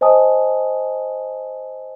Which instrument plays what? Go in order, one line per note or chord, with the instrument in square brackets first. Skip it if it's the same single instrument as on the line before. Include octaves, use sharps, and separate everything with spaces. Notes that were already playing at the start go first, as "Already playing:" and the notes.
[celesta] C5 D#5 G#5 A5 D#6